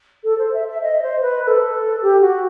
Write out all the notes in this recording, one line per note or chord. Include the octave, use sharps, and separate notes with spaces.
A4
C5
E5
E5
D#5
C5
B4
B4
A4
G4
F#4